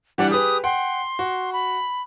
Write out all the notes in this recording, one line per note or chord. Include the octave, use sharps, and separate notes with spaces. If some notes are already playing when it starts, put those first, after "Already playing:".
E3 G3 D4 F#5
G4 G#4 B4 D#6
F#5 G5 C6
F#4
B5